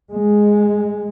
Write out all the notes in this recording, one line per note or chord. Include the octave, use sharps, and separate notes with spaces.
G#3